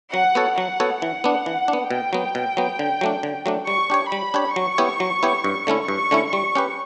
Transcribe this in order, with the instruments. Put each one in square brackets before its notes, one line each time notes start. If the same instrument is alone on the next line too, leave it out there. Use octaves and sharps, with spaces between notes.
[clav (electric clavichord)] F#3 [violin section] F#5
[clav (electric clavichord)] B3 F#4 A4 C#5
[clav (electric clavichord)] F#3 [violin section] F#5
[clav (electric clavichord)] B3 F#4 A4 C#5
[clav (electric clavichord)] E3 [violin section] F#5
[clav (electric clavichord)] B3 D4
E3
D4
B3
[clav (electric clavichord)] B2 [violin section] G5
[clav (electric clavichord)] F#3 B3
B2
F#3 B3
D3
F#3 A3 D4
D3
F#3 A3 D4
[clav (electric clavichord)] G3 [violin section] C#6
[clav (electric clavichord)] D4 G4 C#5
[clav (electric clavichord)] G3 [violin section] B5
[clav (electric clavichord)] D4 G4 C#5
[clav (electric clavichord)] F#3 [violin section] C#6
[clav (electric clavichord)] B3 E4 G4 C#5
F#3
B3 E4 G4 C#5
G2
D3 A3 C#4 E4
[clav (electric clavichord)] G2 [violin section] C#6
[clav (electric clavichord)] D3 A3 C#4 E4
[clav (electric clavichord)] G3 [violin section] C#6
[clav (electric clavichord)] C#4 G4 B4